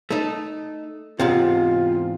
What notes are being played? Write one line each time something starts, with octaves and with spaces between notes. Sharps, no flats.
A3 D#4
E2 G#2 C3 F4